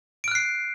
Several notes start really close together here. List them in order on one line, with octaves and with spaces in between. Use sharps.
D7 F6 F#6 C7